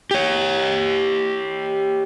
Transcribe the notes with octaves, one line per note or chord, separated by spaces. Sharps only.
G4 C#5